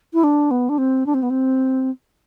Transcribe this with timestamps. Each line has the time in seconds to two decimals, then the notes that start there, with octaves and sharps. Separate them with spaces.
0.14 E4
0.24 D4
0.51 B3
0.69 D4
0.78 C4
1.06 D4
1.14 C4
1.23 B3
1.30 C4